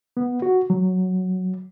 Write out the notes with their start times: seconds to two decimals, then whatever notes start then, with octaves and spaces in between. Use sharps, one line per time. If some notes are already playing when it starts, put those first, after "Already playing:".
0.17 B3
0.42 F#4
0.70 F#3